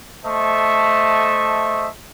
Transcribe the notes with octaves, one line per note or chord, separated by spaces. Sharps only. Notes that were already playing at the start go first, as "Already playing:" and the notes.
A3 C5 D#5 E5 A5 C#6